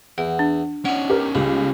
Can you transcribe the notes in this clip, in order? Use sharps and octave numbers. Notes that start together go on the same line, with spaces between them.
E2 F#5
D4
C#4 D#4 C#5 D5 F#5
G4 A#4
C#2 G3